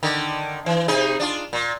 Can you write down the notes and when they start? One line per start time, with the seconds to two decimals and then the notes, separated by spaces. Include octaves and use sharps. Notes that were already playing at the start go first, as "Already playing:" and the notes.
0.03 D3 D#3
0.66 E3
0.88 C3 D#4 G#4
1.20 D4 F4
1.53 A#2